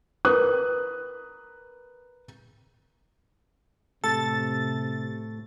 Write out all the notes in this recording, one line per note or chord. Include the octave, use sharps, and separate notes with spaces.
A#4 B4 D#6 F#6
A2 C3 A4 A6